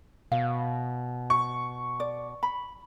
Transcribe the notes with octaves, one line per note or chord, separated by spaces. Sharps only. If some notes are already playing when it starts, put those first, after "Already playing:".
B2 F5
C#6
D5
B5